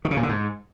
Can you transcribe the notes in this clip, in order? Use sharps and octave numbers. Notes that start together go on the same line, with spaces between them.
D#3
C#3
A#2
D3
G#2